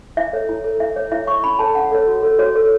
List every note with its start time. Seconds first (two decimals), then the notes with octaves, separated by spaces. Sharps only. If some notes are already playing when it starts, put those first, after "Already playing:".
0.17 E4 E5
0.33 A4 C#5
0.49 E4
0.64 A4 C#5
0.80 E4 E5
0.96 C#5
1.12 E4 E5
1.27 C#5 C#6
1.44 C#4 B5
1.59 A4 C#5 A5
1.75 C#4 F#5
1.91 A4 C#5
2.07 F#4
2.23 A4 C#5
2.39 F#4 C#5
2.55 A4 C#5